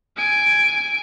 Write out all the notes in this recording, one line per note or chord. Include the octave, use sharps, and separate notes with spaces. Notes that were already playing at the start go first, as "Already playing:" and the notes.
G#5 D7